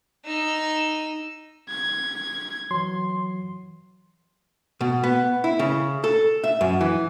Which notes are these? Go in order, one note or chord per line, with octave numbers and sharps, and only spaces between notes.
D#4 E6
G#6
E3 F#3 C6
B2
B3
E4
C#3
A4
E5
F#2
E3